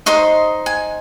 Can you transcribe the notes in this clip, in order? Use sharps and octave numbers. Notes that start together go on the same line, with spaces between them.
D#4 C5 D#5 C6
G#5